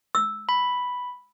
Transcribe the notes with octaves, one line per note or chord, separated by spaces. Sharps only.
E6
B5